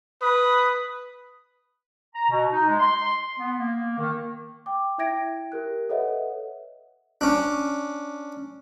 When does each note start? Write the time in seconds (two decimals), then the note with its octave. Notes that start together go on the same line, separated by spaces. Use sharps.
0.21 B4 D#6
2.14 A#5
2.30 B2
2.51 D#4
2.67 G#3
2.80 C6
3.39 B3
3.58 A#3
3.98 D#3
4.66 G5 D6
4.98 E4 E5 G5 G#6 A#6 D7
5.52 G4 A#4 F#6
5.89 A4 B4 C#5 D#5 E5 F#5
7.21 C#4 D4